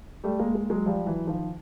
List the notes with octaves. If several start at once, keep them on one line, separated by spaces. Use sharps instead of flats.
G3 A3
G#3 A#3
G#3 A#3
F#3 G#3
F3 G3
E3 F#3
D#3 F3